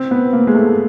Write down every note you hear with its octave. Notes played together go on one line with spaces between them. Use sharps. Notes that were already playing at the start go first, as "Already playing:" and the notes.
Already playing: C4
B3
A#3
G#3
A3